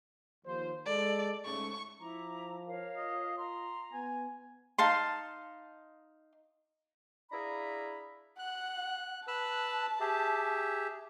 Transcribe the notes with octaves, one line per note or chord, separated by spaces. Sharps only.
D#2 F3 C5
G#3 A4 D5
G#2 C#3 A3 C#6
F3 E4 A#5 D6
A#4 C#5 F5
F4 D#5
A#5 C6
B3 G#5
D#4 F5 A5 C6
D4 E4 G#4 F5 A#5 B5
F#5 F#6
B4 A5 E6 F#6
G4 G#4 E5